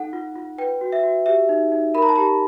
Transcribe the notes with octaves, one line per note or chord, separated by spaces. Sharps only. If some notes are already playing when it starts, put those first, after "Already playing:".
Already playing: D#4 A4 F#5
F4
F4
B4 G5
F#4
E5
F#4
G4 E5
D#4
D#4
A#4 B5
A#5
A5
G4 A#5